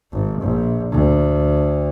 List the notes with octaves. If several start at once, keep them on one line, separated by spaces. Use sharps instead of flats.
G#1
A#1
D2